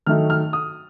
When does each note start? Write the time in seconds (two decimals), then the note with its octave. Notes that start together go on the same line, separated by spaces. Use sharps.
0.06 D#3 F#3 A3 D#4 F6
0.30 F6
0.53 D#6